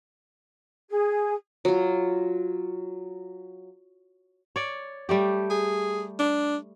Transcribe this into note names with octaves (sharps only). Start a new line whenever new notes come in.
G#4
F#3 F4
C#5 D5
G3 A3 G4
G#4
D4